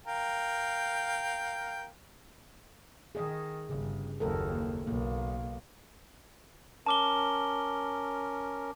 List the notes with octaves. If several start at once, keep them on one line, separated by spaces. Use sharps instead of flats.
A#4 F5 G5
D#3 G#4 D#5
G1 C#3
F#1 D#2 A4 A#4
B1 A#3
C#4 A#4 A5 D6 G7